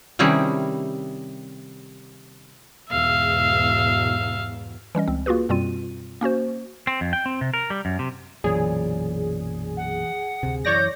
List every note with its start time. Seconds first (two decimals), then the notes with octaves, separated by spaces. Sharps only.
0.19 C3 D#3 G3 C#4 E4 G#4
2.91 E2 G#2 B2 E5 F5
4.95 E3 G3 C#4 D#5
5.07 C#2 C4
5.26 A#3 F4 F#4 G#4 B4
5.49 F#2 B2 G3 C4 F4 D#7
6.21 A#3 C#4 F#4 C5
6.87 C4
7.01 F2
7.13 G5
7.26 C4
7.41 C3
7.54 A#4
7.70 G3
7.85 F#2
7.99 C3
8.44 B1 F#2 A#2 E3 G#4 C#5 D5
9.77 F#5
10.43 D2 C3
10.65 F#2 E3 C#5 D5 G6 A#6